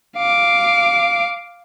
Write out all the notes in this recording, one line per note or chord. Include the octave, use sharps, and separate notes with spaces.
F5 D6